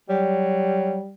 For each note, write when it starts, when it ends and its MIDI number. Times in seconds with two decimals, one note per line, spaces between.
0.09 1.01 54
0.09 1.13 55